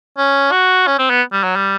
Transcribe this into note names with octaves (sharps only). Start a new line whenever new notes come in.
C#4
F#4
C#4
C4
B3
G3
F#3
G3